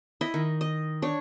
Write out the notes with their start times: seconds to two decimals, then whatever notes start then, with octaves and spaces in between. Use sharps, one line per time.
0.21 E4 D#5
0.34 D#3
0.61 D#5
1.02 D4 C#5